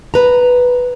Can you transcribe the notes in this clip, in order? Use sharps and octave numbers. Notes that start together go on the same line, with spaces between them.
B4 A#5